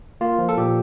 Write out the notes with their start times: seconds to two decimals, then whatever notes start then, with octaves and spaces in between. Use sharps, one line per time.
0.21 A#3 F4
0.38 F3
0.49 A4
0.57 A#2 G4